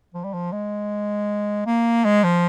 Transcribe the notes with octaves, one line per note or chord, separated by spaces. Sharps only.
F3
G3
F3
G#3
A#3
G#3
F3